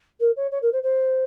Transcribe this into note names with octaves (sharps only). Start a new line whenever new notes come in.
A#4
C#5
C#5
A#4
C5
C5